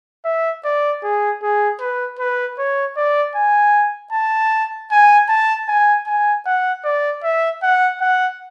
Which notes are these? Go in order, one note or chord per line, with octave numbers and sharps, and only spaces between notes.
E5
D5
G#4
G#4
B4
B4
C#5
D5
G#5
A5
G#5
A5
G#5
G#5
F#5
D5
E5
F#5
F#5